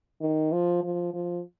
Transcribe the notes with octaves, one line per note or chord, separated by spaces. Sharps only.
D#3
F3
F3
F3